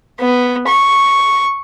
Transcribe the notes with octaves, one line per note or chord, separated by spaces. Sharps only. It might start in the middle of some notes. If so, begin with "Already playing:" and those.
B3
C#6